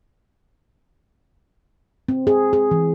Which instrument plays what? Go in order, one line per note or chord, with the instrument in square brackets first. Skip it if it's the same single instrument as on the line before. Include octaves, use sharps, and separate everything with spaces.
[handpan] C4
G#4
G#4
E3